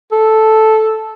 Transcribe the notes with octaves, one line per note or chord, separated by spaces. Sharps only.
A4